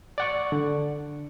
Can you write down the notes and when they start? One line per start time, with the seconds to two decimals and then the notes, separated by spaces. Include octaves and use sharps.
0.18 D5 F#5 C#6
0.52 D3